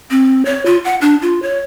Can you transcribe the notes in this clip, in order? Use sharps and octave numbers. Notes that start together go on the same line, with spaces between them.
C4
C#5
F4
F#5
D4
F4
C#5